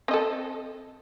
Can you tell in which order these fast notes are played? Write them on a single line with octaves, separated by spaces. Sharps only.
C4 D#5 A4